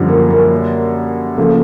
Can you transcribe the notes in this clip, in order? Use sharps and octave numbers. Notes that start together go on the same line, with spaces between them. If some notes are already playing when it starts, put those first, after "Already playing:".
Already playing: F#2 D3 F3 G3
A#3
A#3
C#3 F3 A3 A#3